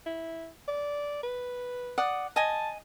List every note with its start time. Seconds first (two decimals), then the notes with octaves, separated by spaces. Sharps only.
0.06 E4
0.68 D5
1.23 B4
1.98 D5 F#5 D#6
2.36 D#5 G#5 A5